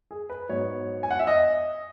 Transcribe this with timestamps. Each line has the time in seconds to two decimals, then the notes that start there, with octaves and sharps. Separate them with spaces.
0.11 G#4
0.30 B4
0.49 G#2 F#3 B3 C#5
1.03 G#5
1.11 F#5
1.19 E5
1.27 D#5